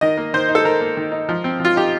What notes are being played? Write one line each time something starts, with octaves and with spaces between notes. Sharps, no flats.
D#3 D#5
A#3
D#3 C5
D#4
A4
D#3 A#4
A#3
D#3
D#4
F3
C4
F3 F4
D#4 G4